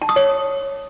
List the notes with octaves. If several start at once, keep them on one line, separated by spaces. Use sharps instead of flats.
A5
D#6
C#5